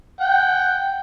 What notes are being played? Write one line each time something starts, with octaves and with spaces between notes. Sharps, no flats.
F#5 G5